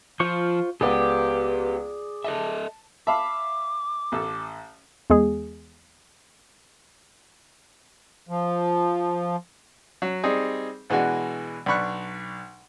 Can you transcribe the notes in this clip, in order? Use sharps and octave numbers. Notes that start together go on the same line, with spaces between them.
F3 F4 C5 C#6
C#2 B3 G4 G#4 D5
A4 D#5 E5 A5
E5 F5 A5 B5 D6
A1 A4
E2 G#3 G#4
F3
F#3
G3 C4 D#4 G#4
B2 E3 G#3 D4 F#4
B1 D4 B5 C#6 F#6